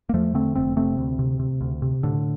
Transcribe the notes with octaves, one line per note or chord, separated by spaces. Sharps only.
A#3
E2 F3 A3
D3 A3 C4
F1 A3 C4
C3 A3 C4
D2
C3
C3
D2
C3
A2 D3